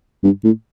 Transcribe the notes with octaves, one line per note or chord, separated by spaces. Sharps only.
G2
A2